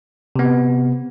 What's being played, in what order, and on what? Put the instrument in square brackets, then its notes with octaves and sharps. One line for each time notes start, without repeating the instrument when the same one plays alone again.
[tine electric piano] C3 B3